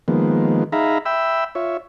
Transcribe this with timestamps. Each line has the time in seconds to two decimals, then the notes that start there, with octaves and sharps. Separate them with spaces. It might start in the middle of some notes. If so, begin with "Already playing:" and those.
0.08 D#3 F3 G#3 A#3 B3
0.72 D#4 G#4 E5 F5 A#5 B5
1.06 E5 G5 B5 E6
1.55 F4 C#5 E5